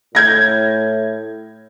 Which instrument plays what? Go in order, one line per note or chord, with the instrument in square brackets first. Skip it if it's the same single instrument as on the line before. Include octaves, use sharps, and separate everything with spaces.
[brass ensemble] A2 [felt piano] G6 G#6 A#6